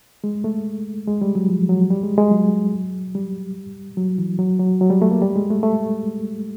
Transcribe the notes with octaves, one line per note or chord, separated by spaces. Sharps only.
G#3
A3
G#3
G3
F#3
F3
F#3
G3
G#3
G#3
F#3
G3
F#3
E3
F#3
F#3
F#3
G3
A3
A#3
G3
G#3
A3
A3